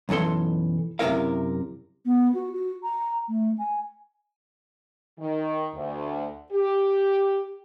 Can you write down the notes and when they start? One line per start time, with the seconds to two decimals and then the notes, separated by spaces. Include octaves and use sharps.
0.09 B1 F#2 E3 A4 C6
0.99 F#2 C3 G#3 E4 A#4 F5
2.06 B3
2.34 F#4
2.53 F#4
2.83 A#5
3.29 A3
3.58 G#5
5.19 D#3
5.75 D2
6.52 G4